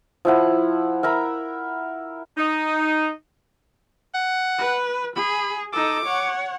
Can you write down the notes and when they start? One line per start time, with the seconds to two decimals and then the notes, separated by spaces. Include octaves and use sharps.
0.25 F3 E4 F#5
1.03 A#4 E5 A#5 B5
2.37 D#4
4.14 F#5
4.58 B4
5.16 G#4 B5
5.73 D#4 A4 D6
6.05 C#5 F#5